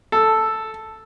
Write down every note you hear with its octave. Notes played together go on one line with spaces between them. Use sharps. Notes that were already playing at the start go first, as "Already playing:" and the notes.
A4